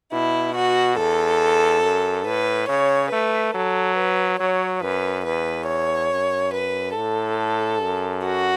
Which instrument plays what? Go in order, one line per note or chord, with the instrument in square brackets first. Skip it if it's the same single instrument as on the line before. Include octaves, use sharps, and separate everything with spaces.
[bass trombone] B2 [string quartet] E4
[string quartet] F#4
[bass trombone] E2 [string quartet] A4
[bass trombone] F#2
[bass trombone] A2 [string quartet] B4
[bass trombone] C#3 [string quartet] C#5
[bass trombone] A3 [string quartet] B4
[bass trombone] F#3 [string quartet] A4
[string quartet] B4
[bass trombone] F#3 [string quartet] C#5
[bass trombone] F#2 [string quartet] B4
[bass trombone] E2 [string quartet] B4
[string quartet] C#5
[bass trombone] F#2
[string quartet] B4
[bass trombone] A2 [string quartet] A4
[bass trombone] F#2
[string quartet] F#4